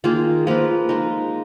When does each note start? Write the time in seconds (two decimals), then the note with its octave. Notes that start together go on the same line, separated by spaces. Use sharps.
0.04 D#3 A#3 F4 G#4
0.47 F3 A#3 F4 B4
0.89 G#3 D#4 A#4